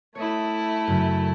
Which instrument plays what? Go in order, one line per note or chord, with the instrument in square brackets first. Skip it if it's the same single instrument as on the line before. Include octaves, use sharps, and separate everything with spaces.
[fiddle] A3 E4 [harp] C#5 D#5
[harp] F#2 C#3